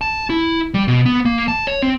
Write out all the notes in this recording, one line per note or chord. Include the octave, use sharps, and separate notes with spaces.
A5
E4
G3
B2
B3
A#3
A5
C#5
C4